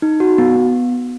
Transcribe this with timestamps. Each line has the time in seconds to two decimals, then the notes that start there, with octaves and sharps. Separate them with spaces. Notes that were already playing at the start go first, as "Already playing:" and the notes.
0.02 D#4
0.20 F#4
0.38 B3
0.56 B3